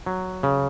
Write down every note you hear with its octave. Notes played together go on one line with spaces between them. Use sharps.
F#3
C#3